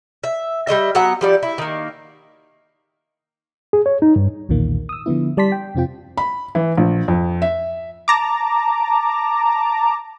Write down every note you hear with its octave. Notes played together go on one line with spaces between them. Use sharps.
E5
G3 G#3 D#5 E5
F#3 B3 F#5 A#5
F3 G3 D5
E4
D#3 A#3
G#4
C#5
D#4
G2
B1 E2 A#2 D#3 A#3
D#6 E6
D3 F3 B3 E4
G3 D5 A5 C6 B6
G5
F2 C3 C4 F4 G5
B5
E3
A#1
F2
E5
A5 A#5 D6